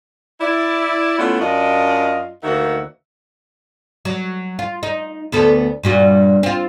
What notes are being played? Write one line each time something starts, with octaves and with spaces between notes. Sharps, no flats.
E4 D5
A3 B3 C#4 E4 F4
F#2 D4 F4 D#5
D2 D#3 A#3 F#4 E5 F#5
F#3
F4
D#4
D2 B3 A4
G2 A#2 F#4
C4 F4